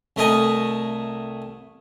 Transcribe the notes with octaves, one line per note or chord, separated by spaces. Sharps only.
C2 A3 A#4 D#5 G#5